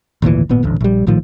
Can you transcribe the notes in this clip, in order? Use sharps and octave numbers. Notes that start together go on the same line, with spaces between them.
G#1 D2 A#2 E3
G#1 A#2 B3
D#1 A1 D2
A#1 G3
A#1 A2 D#3 F3